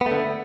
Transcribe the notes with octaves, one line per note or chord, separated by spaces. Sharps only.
D3 A3 B3